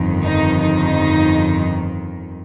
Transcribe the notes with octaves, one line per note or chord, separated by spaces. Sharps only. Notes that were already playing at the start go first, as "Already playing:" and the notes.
Already playing: G1 F2 D#3
D#4
D#4